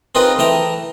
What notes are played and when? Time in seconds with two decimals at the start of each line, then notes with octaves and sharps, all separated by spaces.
0.15 C4 D#4 F4 G#4 A#4 B4
0.39 E3 A3 G5 A#5